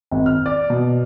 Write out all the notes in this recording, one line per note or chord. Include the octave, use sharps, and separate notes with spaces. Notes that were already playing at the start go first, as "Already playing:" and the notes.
G#1
F6
D5
B2